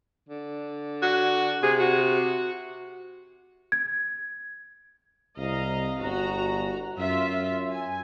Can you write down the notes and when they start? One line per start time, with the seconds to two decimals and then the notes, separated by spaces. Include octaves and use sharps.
0.29 D3
1.02 F#4
1.63 C3 G#4
1.80 F#4
3.72 G#6
5.37 C2 D#5 F5 A#5
6.00 G1 F#4 A#5
6.98 F#2 F4 E5
7.70 G#5